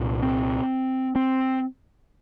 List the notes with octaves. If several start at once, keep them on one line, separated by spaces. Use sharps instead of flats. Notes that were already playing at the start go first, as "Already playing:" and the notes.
Already playing: C2 A#2
C4
C4